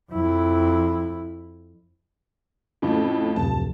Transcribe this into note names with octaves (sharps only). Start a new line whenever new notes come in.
F2 E4
F2 A2 C#3
D1 F2 C3 A5